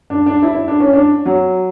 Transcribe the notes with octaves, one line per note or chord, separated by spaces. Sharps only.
D4
D4
E4
E4
D4
C#4
D4
F#3